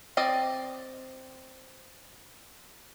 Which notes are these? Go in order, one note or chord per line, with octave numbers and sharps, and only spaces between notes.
C4 D5 D#5